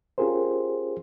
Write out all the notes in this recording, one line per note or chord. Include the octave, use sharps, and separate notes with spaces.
C#4 F4 G4 G#4 A#4 C5